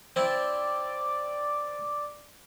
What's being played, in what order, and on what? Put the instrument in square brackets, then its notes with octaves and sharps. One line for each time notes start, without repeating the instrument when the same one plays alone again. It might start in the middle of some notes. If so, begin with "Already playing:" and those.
[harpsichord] C4 E4 [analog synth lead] D5